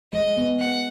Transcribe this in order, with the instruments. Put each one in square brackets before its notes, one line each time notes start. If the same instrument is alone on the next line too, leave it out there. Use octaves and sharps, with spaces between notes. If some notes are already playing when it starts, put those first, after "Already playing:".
[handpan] G#3 [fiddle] D#5
[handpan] B3
[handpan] B3 [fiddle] F#5